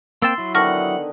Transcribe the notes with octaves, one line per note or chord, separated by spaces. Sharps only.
A#3 C4 G5 C6 E6 A6 E7
F#3 E4
D3 D#3 B3 F#5 C#6 F6 A#6